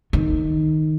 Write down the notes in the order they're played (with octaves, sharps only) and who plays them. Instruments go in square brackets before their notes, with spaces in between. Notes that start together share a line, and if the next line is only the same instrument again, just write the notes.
[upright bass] D#3